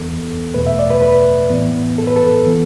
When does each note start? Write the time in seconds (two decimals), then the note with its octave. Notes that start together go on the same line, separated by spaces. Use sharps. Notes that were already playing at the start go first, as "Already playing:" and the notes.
Already playing: E2 E3 B3 A4
0.54 E2 B2 A3 B4
0.67 E5
0.79 D5
0.90 B4
1.02 B4
1.50 A2 E3 B3
1.98 A4
2.07 B4
2.16 A4
2.46 E3 B3